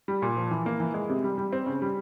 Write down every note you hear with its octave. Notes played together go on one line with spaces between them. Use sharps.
G3
A#2
F3
E3
A#3
E3
G#3
C3
G3
G3
C4
C#3
G3